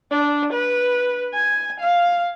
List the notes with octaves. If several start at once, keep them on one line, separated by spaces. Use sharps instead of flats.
D4
B4
G#5
F5